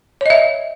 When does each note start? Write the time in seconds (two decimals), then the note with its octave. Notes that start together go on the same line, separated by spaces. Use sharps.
0.21 C#5
0.26 D#5
0.30 E5